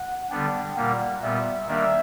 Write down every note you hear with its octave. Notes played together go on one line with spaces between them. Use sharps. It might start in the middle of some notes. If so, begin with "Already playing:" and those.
Already playing: F#5
D3 G3 B3 D4 G5
A#2 G3 A#3 F#5
A#2 G3 B3 E5
D#3 G3 A#3 D4 E5